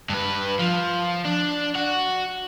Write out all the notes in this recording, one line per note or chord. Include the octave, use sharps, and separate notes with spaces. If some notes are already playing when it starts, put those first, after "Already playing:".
G2 B4
F3
D4
F#4